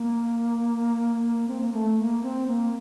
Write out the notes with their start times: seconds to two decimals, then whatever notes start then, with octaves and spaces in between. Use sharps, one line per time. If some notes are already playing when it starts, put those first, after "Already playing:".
Already playing: A#3
1.48 C4
1.60 A#3
1.73 A3
1.98 A#3
2.23 C4
2.47 A#3